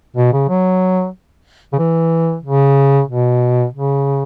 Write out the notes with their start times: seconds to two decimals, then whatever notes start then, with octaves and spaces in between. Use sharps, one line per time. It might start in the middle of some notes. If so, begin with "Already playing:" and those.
0.16 B2
0.33 C#3
0.49 F#3
1.73 C#3
1.79 E3
2.43 C#3
3.08 B2
3.73 C#3